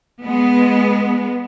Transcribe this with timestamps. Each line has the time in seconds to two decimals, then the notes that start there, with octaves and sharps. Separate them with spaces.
0.24 G#3 B3